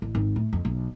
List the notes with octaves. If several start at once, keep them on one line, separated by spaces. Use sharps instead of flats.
A1
G#1
A2
F2
B1